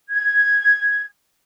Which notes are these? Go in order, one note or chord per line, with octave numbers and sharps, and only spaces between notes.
G#6